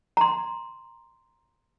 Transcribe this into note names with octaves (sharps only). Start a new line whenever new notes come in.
A#5 C6